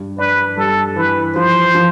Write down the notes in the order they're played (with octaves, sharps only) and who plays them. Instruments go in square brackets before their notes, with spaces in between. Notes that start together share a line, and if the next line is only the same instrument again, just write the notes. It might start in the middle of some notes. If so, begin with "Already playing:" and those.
Already playing: [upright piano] G2
[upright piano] D4 [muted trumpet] B4
[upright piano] G2 [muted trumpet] A4
[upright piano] E3 [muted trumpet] B4
[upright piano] F3 [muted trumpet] C5
[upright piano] F3